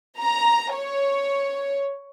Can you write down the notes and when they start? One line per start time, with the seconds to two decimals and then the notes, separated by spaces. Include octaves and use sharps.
0.19 A#5
0.73 C#5